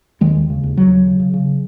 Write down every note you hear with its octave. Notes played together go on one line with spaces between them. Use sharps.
D#2 D#3 G#3
D#2
C#3
D#2
D#2 F#3
C#3
C#3
C#3
C#3